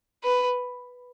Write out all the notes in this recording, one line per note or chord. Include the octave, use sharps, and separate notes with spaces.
B4